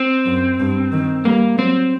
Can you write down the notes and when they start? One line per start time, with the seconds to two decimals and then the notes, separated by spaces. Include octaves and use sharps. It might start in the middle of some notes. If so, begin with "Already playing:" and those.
Already playing: C4
0.26 F#2
0.60 G2
0.92 D#3
1.25 G3 A#3
1.58 F#3 C4